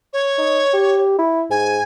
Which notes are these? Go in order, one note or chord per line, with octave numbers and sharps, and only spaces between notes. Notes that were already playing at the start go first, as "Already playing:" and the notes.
C#5
D#4
G4
E4
G#2 G#5